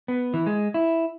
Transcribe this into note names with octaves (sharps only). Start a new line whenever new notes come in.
B3
E3
G#3
E4